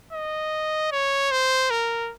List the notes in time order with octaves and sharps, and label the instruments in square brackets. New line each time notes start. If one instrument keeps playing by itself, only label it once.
[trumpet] D#5
C#5
C5
A#4